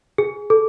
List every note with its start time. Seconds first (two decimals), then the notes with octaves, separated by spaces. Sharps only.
0.18 G#4
0.50 A4